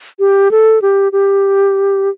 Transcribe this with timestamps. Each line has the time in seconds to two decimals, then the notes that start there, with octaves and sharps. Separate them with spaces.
0.19 G4
0.51 A4
0.82 G4
1.12 G4